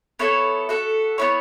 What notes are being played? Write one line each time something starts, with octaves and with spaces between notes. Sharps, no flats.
B3 E4 A4 C#5
F#4 A4 E5
B3 E4 C#5